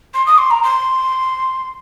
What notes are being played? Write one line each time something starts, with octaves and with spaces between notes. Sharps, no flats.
C6
D#6
C6
A#5
C6